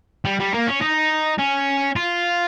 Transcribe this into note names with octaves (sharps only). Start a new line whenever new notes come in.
G3
G3
A#3
C#4
D#4
C#4
F4